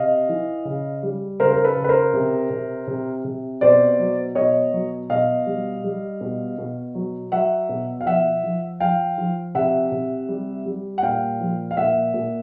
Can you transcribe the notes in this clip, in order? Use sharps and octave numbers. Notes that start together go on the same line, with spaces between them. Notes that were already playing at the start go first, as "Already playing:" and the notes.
Already playing: C3 D#5 F5
E3
C#3
G3
C#3 A#4 C5
A#4
A4 B4
C#3
B4
A#4 C5
C3
C3
C3
C3
B2 C5 D5
F#3
B2 C#5 D#5
F#3
B2 D#5 F5
G3
G3
B2
B2
F#3
F#3 E5 F#5
B2
F5
F3 E5 F#5
F3
F3 F5 G5
F3
C3 E5 F#5
C3
G3
G3
F#5
A#2 F5 G5
F3
F5
A#2 E5 F#5
A#2